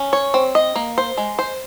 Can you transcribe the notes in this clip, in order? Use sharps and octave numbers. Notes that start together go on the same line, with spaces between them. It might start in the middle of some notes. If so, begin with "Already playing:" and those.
Already playing: C#4
C#5
C4
D#5
A#3
C5
G#3
C5